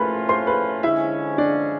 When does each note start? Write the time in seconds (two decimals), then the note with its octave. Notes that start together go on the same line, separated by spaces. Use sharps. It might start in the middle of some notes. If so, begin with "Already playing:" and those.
Already playing: A2 F3 A3 C#4 F4 A#4 B4 B5
0.29 C5 C6
0.47 B4 B5
0.83 D3 F3 G#3 C#4 E4 E5
1.38 D4 D5